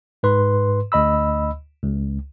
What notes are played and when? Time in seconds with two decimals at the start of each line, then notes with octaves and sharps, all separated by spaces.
0.23 G#2 B4 C6
0.92 D2 D#5 B5 E6
1.83 C#2